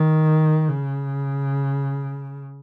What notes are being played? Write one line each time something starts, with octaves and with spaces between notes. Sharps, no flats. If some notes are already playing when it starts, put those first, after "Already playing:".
Already playing: D#3
C#3